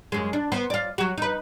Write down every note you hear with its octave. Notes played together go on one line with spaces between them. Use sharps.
F#2 G#3
D4
B3 C5
F4 D5
F#3 F#4
D#4 B4